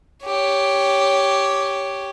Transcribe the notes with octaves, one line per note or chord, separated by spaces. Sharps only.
G4 C#5